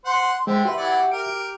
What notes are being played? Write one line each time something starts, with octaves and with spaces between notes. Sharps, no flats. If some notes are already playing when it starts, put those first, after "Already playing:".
C5 F#5 C6
D3 G#3 C5 E5 G5
F#4 G4 B4 E5 C6
E3 F#3 D5 F#5
A#4 D7